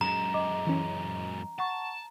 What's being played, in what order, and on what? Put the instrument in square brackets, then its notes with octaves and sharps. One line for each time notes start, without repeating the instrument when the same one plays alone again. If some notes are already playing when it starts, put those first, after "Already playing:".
[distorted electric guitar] F#2 G#3 [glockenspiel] A#5
[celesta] D#5 D6
[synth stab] E3 C#4
[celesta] F#5 C#6 [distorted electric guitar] A5